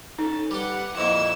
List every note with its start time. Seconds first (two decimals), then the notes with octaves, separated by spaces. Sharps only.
0.18 C#4 D#4 A4
0.51 G3 G4 B4 F#5
0.97 F2 A#2 E4 D#5 E6